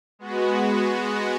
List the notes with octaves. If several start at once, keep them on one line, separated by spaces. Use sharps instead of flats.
G#3 B3 F#4